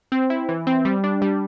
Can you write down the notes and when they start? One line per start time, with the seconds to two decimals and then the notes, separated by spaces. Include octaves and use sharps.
0.12 C4
0.30 E4
0.49 E3
0.67 C4
0.85 G3
1.04 D4
1.22 G3